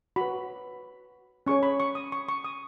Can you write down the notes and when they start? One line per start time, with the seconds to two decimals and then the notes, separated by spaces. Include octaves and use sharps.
0.16 F#4 B4 B5
1.47 C#4 G#4 C#5 C#6
1.63 B5
1.80 C#6
1.95 D#6
2.12 C#6
2.29 C#6
2.44 D#6